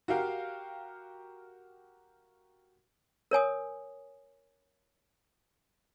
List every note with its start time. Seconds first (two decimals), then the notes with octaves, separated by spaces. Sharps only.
0.08 F#4 G4 A#4 F5 G5
3.31 A#4 C#5 G#5 D#6